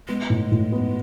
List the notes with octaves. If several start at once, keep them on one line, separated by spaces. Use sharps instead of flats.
G#3 B3
A2
A2
B3